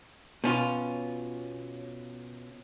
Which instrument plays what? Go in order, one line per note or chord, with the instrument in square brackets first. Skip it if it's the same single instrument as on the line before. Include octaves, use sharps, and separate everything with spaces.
[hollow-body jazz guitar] B2 C#4 F4